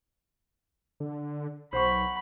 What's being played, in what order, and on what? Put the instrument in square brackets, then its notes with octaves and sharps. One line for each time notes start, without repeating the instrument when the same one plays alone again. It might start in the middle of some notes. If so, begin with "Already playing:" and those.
[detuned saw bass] D3
[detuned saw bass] B1 [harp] C5 F#5 C#6 [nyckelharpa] B5